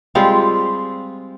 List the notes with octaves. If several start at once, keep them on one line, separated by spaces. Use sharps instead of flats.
G3 G#3 C4 F4